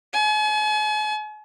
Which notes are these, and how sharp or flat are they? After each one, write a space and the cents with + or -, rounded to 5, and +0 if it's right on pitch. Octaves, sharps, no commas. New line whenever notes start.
G#5 +40